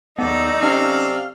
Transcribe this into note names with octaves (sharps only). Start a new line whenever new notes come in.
D#2 F#3 B3 D#4 A4 D5
C3 C#4 F5